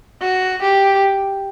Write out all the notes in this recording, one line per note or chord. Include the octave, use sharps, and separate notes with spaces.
F#4
G4